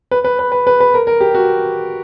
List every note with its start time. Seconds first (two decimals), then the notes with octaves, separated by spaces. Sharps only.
0.11 B4
0.25 B4
0.39 B4
0.52 B4
0.67 B4
0.80 B4
0.94 A#4
1.07 A#4
1.21 G4
1.34 F#4